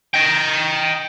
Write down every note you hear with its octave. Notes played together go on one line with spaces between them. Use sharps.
D#5 G5